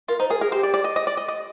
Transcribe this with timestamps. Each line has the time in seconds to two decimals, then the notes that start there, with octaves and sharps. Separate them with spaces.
0.08 F4 A#4
0.19 D#4 C5
0.30 G#4 A#4
0.41 G#4 A#4
0.52 G4 C5
0.63 D5
0.74 D5
0.84 D#5
0.96 D#5
1.07 D5
1.17 D#5
1.29 D#5